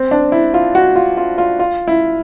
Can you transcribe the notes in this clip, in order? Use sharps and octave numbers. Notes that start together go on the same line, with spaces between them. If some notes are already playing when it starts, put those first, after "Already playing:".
Already playing: C4
D4
E4
F4
F#4
F4
F4
F4
F4
E4